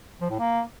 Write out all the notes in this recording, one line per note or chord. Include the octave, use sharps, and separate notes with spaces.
F3
A2
A#3